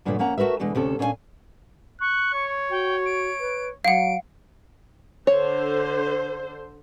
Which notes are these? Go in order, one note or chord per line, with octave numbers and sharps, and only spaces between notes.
G2 A#2 D3 F#3 A#3 B3
F2 A#3 C#4 F#5 A#5
A3 F#4 A#4 B4 E5
B2 D3 E3 G#3
D2 C3 C#4 A4
A#2 C#4 D4 E4 F5 G#5
C#6 F#6
C#5
F#4 G5
D7
B4
F#3 F5 F#5 D7
D3 C5 C#5